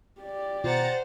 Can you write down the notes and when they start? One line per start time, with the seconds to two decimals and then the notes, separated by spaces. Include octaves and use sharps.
0.21 G4 D5
0.64 B2 D#3 F4 C5 F#5 A#5 A6